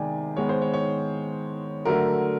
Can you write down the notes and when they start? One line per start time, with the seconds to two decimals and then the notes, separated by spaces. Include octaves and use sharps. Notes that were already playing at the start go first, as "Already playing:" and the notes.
Already playing: C3 D#3 G#3 B3 D5 G5 G#5
0.37 D#3 G#3 B3 C#5
0.49 C5
0.62 C#5
0.73 C#5
1.85 D3 F#3 A3 A#4